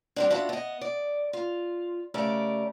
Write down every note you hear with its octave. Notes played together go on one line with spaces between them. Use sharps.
G3 C4 D4
B3 D4 F4 F#4 E5
B3 D#5
D5
F4
C#3 A3 G4 A#4 D5